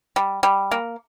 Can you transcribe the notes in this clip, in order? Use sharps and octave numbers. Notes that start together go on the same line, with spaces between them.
G3
G3
A#3